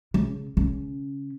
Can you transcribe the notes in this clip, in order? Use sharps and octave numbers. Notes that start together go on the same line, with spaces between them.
C#3
C#3 C#4